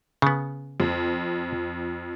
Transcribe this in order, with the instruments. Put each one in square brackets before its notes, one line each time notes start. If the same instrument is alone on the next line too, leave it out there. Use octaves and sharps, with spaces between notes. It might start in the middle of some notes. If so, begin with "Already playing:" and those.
[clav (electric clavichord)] C#3 B3
[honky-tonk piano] F2